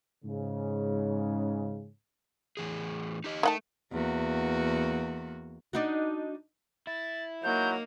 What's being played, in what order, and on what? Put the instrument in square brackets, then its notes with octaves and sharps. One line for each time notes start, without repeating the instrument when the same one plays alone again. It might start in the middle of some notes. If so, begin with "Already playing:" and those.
[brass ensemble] G#2 C#3
[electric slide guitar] A2 E3 G#4
D#4 G4 D#5
[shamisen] D#3 F#5 A5 [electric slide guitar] A3
[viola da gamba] E2 A#3 F#4
[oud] D4 D#4 F#4
[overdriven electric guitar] E4 [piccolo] A6
[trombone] F#3 [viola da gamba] A#3 D#4 [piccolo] G6